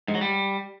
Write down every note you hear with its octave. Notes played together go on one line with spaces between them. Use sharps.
G#2
F#3
G3